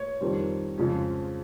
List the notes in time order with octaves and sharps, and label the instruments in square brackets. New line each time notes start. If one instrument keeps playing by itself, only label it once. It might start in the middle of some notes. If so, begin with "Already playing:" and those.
Already playing: [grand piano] C#5
F2 D#3 G3 C4
F2 C#3 F3 G#3 C#4